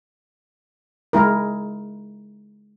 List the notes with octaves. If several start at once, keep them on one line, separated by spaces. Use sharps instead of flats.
G#3 E4 A#4